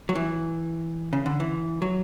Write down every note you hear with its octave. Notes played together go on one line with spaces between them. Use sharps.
F#3
E3
C#3
D3
E3
F#3